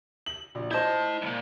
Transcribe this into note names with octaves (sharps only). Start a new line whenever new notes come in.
F#7
A#1
E4 C5 D#5 A5 G6
C2 A#2